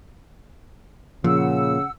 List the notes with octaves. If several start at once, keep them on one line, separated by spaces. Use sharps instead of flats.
A#2 C#3 F3 F#5 E6